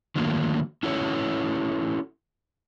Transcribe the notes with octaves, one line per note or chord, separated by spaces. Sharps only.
D3 D#3 F3 F#3 A3 A#3
C#4 E4 F#4 A4 C#5